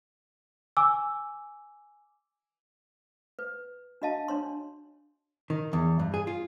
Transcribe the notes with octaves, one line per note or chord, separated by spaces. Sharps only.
G#5 D6 E6
B4
D4 F#4 D#5 F5 A5
D4 C#5 C6
D#3
E2
G2
G#4
F4